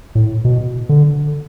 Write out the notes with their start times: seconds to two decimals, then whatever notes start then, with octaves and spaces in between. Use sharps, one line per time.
0.15 A2
0.45 B2
0.89 D3